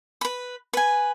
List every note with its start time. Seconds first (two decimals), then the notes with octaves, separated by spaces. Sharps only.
0.21 B4 B5
0.73 B4 G#5